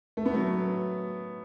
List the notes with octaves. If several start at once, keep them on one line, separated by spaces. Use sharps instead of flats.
A3
B3
F#3 A3